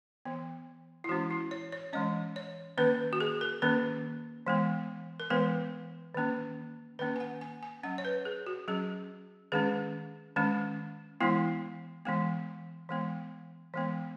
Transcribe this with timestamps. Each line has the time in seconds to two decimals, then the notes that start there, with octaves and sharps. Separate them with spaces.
0.25 E3 B3
1.04 E4
1.09 E3 G#3 C#4 F#4
1.30 E4
1.51 C#5
1.72 C#5
1.93 E3 G#3 C#4 D#5
2.36 C#5
2.78 D#3 A#3 C#4 B4
3.13 F#4
3.20 G#4
3.41 A#4
3.62 D#3 A#3 C#4 A#4
4.46 E3 G#3 B3
5.20 A#4
5.30 E3 G#3 B3 B4
6.14 D#3 A#3 C#4
6.99 D#3 A#3 C#4 B4
7.16 G#5
7.20 F#5
7.41 G#5
7.63 G#5
7.83 F#3 C#4 F#5
7.98 C#5
8.05 B4
8.25 G#4
8.47 F#4
8.68 F#3 C#4 G#4
9.52 D#3 G#3 C#4 G#4
10.36 D#3 G#3 C#4
11.21 E3 G#3 B3 E4
12.05 E3 G#3 B3
12.89 E3 G#3 B3
13.74 E3 G#3 B3